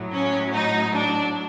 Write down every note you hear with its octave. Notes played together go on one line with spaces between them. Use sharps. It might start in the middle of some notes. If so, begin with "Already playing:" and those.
Already playing: A2 F#3
C#4
D#4
D4